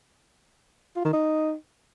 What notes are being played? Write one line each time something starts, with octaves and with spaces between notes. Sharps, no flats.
F4
D#3
D#4